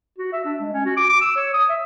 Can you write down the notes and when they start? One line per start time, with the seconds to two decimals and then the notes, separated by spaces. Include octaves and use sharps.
0.19 F#4
0.33 E5
0.45 D4
0.60 G#3
0.73 C#4
0.86 F#4
0.97 D6
1.09 D6
1.21 E6
1.36 C#5
1.53 D#6
1.69 E5